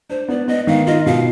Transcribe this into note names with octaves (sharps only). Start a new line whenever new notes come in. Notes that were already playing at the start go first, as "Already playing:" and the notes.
D4 C5
B3 D5
B3 D#5
D#3 F5
F4 D#5
B2 F5